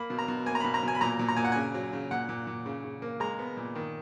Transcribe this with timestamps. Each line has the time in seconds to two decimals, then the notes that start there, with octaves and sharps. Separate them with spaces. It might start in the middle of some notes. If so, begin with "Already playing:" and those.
Already playing: A#3 B5
0.10 B2
0.19 A#5
0.28 B2
0.46 A#3 G#5
0.55 A#5
0.60 B2 B5
0.74 A#5
0.83 B2 G#5
0.95 B5
1.01 A#2 A#5
1.19 A#2
1.28 A#5
1.37 A#2 G#5
1.44 F#5
1.52 C#3 G#5
1.74 F#3
1.93 C#3
2.11 A#2 F#5
2.29 A#2
2.47 A#2
2.66 C#3
2.84 C#3
3.02 A#3
3.20 G#3 A#5
3.39 B3
3.57 A#2
3.75 D#3